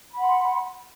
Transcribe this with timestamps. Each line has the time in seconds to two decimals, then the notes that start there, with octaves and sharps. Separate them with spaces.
0.12 B5
0.17 F#5
0.22 C6